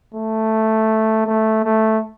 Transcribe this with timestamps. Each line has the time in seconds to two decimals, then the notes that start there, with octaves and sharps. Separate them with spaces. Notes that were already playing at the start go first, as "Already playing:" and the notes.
0.14 A3
1.27 A3
1.64 A3